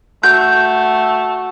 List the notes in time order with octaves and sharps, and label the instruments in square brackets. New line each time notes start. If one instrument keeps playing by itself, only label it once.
[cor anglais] A3 [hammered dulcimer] F#4 [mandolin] G6